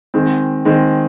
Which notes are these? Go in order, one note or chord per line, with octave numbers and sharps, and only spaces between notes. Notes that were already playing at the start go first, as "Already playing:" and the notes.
D#3 G#3 C4
D#3 G#3 C4